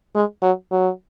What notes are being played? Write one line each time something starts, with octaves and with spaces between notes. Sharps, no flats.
G#3
F#3
F#3